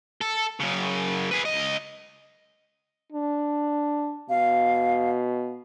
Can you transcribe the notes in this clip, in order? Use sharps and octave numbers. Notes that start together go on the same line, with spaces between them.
A4
F#2 C#3
G#4 B4
C#2 D#5
D4
B2 F5